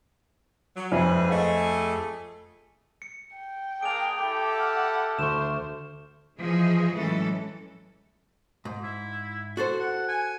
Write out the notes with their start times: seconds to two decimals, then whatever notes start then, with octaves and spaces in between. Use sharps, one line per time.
0.75 F#3
0.92 F2 G#2 G#4 B4 D5 E5 G#5
1.29 A3 G#4 D#5 F5 F#5
3.02 C#7
3.36 G5
3.83 A#3 D4 G#4 D7 F7
4.19 E4 G4 A4 D6
4.60 F#5 F6
5.19 D2 A3 C5 C#6 E7
6.39 E3 F3 G#4 D#5
6.92 A2 E3 F#3 G#3 C#4 A4
8.65 G#2
8.84 E4
9.57 F#4 A4 C5
9.80 F#5
10.08 G#5